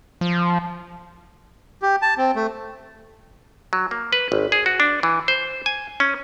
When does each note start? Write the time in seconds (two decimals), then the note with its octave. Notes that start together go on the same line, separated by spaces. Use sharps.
0.21 F3
1.82 G4
2.02 A5
2.18 C4
2.35 A3
3.73 F#3
3.91 A#3
4.13 B4
4.32 G#1
4.52 G#4
4.66 F#4
4.80 D4
5.03 E3
5.28 C5
5.66 G#5
6.00 C#4